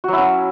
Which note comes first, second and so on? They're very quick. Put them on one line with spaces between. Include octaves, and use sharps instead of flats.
F#4 F#3 E4 C#4